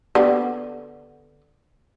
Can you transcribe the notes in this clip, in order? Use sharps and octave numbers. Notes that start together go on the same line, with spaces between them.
D3 B3 G4